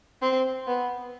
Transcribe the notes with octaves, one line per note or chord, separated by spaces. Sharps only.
C4
B3